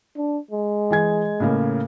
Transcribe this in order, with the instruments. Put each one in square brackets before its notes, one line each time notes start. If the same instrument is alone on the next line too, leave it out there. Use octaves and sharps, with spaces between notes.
[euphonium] D4
G#3
[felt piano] E3 G#4 G#6
A2 C#3 A#3